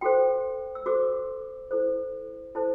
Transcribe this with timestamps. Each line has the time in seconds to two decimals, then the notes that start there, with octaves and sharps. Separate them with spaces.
0.01 F#4 A4 C5 G5
0.75 E6
0.86 F#4 A4 C5 D6
1.71 E4 A4 C5
2.55 E4 A4 C5 A5